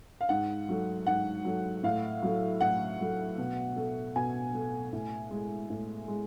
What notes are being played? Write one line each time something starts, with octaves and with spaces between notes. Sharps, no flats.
F5
G#2 F#5
F#3 A3
G#2 F#5
F#3 A3
A2 F5
F#3 A3
A2 F#5
F#3 A3
B2
A3
B2 G#5
A3
A2
G#3
A2
G#3